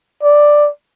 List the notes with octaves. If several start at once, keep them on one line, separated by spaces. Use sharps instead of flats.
D5